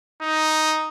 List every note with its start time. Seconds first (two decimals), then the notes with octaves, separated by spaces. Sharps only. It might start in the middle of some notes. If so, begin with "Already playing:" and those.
0.22 D#4